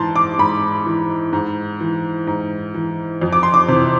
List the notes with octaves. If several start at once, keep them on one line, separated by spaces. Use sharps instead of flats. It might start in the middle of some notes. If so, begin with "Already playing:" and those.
Already playing: G#2 E3 A5 C6
D6
G#2 B5
E3
G#2
E3
G#2
E3
F2
D6
C6
D6
C3 E3